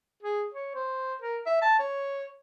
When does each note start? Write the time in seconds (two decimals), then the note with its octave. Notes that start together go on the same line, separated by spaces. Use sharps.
0.23 G#4
0.54 C#5
0.75 C5
1.22 A#4
1.46 E5
1.62 A5
1.80 C#5